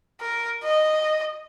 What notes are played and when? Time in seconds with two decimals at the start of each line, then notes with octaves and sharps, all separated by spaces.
0.21 A#4
0.63 D#5